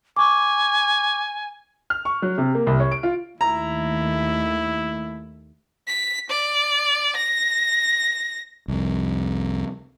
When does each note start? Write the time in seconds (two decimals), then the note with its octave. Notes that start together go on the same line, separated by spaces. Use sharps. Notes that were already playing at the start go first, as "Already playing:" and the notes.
0.17 G#5 C#6 D6
1.90 F6
2.05 C#6
2.22 F#3
2.38 C3
2.55 A#3
2.67 C2
2.80 C#5
2.91 D7
3.03 F4
3.41 D#2 A3 E4 A#5
5.88 B6
6.30 D5
7.16 A#6
8.68 C2 F2